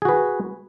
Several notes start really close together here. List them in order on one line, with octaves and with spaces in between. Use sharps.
G#4 F#4 B4